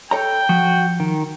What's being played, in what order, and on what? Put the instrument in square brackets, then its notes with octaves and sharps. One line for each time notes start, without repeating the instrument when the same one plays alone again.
[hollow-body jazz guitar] A4 C#5 A#5 [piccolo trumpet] G5
[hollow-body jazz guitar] F3 [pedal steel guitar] F#4
[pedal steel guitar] D#3